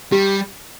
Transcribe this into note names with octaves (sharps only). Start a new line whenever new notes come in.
G3 G4